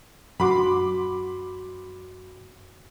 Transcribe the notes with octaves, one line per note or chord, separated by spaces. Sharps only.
F#2 F#4 B5 C6 D6